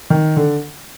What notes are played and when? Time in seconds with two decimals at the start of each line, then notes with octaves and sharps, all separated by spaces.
0.10 D#3
0.36 D3